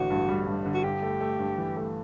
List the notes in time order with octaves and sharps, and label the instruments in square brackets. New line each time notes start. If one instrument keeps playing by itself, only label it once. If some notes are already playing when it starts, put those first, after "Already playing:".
Already playing: [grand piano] A1 D3 [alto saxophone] F#4
[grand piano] G2
G3
G2
D3
[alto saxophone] F#4
[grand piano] G2 [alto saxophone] G4
[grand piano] A3
A3
G2
E3
A3